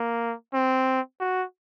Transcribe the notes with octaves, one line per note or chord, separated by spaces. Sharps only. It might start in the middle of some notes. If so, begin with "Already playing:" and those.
Already playing: A#3
C4
F#4